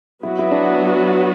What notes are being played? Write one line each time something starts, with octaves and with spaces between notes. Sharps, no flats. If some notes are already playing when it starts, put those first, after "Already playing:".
F#3 B3 E4 F#4
E4
D4